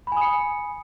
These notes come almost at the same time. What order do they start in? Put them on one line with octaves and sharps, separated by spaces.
B5 G#5 D#6 C#7